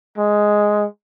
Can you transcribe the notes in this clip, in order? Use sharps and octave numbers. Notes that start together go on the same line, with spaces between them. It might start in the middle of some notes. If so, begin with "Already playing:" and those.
G#3